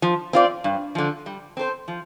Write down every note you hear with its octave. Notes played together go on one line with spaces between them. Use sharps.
F3
C4 F4 D5
G2
D3 F3
G3
C4 A4 C5
F3